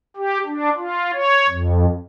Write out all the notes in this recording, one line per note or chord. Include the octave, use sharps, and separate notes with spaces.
G4
D4
F4
C#5
F2